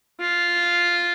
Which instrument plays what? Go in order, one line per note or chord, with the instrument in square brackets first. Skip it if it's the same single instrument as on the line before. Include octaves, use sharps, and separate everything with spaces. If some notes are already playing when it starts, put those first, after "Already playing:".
[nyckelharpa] F4